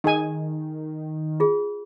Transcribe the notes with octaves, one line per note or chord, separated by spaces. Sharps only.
D#3 D#4 G#4 G#5
F4 G#4